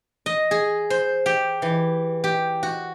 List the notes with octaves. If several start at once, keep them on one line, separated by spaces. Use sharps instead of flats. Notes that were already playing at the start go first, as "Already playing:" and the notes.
D#5
G#4
C5
G4
E3
G4
F#4